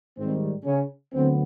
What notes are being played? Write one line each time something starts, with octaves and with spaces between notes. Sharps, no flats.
G#2 D#3 G3 C4
C#3 C#4
D2 D3 F#3 B3 C4